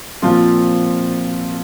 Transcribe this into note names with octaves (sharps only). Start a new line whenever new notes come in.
A#2 F3 C4 F4